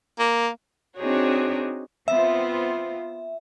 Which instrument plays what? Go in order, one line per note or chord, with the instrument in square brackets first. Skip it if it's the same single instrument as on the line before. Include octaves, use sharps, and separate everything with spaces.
[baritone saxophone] A#3
[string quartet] C4 D4 D#4 F#4 G#4 C#5
[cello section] B3 C4 F4 [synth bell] E5